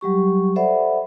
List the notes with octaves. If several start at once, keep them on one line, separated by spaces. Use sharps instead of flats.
F#3 G3 G4 C#6
A4 C5 D5 E5 F#5 B5